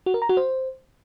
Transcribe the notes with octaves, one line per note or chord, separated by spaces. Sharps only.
F#4
A#4
A#5
F#4
C5